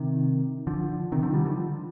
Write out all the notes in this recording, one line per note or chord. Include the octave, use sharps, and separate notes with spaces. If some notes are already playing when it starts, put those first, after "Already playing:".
Already playing: C3 D#3
D3 F3
C3 D#3
D3 F3
D#3 G3
D3 F3